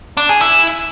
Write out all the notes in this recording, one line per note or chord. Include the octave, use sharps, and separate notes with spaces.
D4
G#4
E4